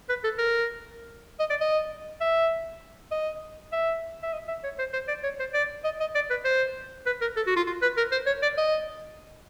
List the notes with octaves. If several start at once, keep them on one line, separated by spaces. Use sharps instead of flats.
B4
A4
A#4
D#5
D5
D#5
E5
D#5
E5
E5
D#5
E5
C#5
C5
C5
D5
C#5
C5
D5
D#5
D#5
D5
B4
C5
B4
A#4
A4
F#4
F4
F4
B4
A#4
C5
C#5
D5
D#5